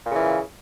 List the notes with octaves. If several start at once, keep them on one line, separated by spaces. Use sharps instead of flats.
A#2 C#3 E3